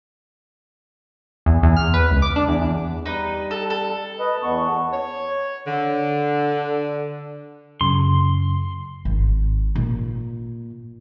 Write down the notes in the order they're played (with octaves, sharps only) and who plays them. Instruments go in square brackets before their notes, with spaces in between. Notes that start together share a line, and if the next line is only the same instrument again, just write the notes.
[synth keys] E2
E2
F6
B4
C#2
D6
D4
E2
E2
[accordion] G3 [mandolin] D#4 B4 B5
[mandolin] A4
A4
[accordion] B4 D#5
E2 B3 C#6
[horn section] C#5
D3
[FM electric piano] F#2 C#3 [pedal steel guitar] C6
[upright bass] G#1
A#2